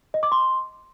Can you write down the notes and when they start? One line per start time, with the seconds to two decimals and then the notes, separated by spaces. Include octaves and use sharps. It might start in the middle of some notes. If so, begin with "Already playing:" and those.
0.14 D#5
0.23 D6
0.32 C6